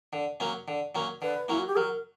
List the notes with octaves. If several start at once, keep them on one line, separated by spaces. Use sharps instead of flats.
D3
F#3 A#3 C#4
D3
F#3 A#3 C#4
D3 B4
F#3 A#3 C#4 E4
F#4
G4
F#3 A#4